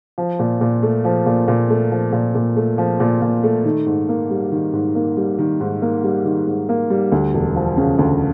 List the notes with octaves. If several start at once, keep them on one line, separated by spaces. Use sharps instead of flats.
F3
A#2
A#2
A3
F3
A#2
A#2
A3
F3
A#2
A#2
A3
F3
A#2
A#2
A3
D#3
G#2
A#3
G3
D#3
G#2
A#3
G3
D#3
G#2
A#3
G3
D#3
G#2
A#3
G3
D2
E1
F3
C#3
D2